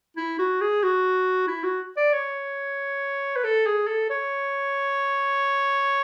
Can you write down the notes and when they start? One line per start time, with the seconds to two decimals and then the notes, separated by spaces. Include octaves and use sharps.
0.17 E4
0.39 F#4
0.61 G#4
0.83 F#4
1.47 E4
1.63 F#4
1.97 D5
2.13 C#5
3.36 B4
3.44 A4
3.66 G#4
3.87 A4
4.10 C#5